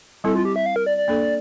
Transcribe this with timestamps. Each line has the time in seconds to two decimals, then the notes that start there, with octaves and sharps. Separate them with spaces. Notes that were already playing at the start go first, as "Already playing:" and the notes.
0.24 G3 C4 E4 A4
0.35 F4
0.45 G4
0.56 E5
0.66 F5
0.76 A#4
0.86 D5
0.97 D5
1.08 A#3 D4 A4